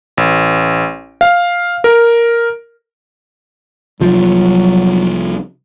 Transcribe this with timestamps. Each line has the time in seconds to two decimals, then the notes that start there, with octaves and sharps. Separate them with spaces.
0.17 A1
1.21 F5
1.84 A#4
4.00 C2 F3 F#3